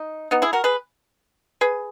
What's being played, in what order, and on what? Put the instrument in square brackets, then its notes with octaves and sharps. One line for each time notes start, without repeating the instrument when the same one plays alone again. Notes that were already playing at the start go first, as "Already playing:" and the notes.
Already playing: [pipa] D#4
B3 D#4
E4 G#4
F#4 A#4
G#4 B4
G#4 B4